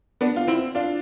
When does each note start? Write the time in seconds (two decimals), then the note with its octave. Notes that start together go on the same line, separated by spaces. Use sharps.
0.21 B3 D4
0.36 F4
0.48 C4 E4
0.75 D4 F4